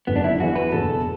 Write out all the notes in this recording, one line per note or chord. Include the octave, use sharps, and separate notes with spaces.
F#1 F#2 D3 B3
D4
E4
E2 E3 B3 E4 F#4
B4
F#1 E2 B2 A4